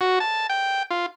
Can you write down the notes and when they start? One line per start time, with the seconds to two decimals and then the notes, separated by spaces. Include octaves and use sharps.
0.01 F#4
0.20 A5
0.50 G5
0.90 F4